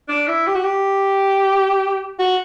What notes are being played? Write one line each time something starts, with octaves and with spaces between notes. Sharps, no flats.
D4
E4
G4
F#4
G4
F#4